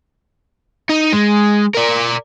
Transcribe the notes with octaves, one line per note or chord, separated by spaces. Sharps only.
D#4
G#3
A#4 D5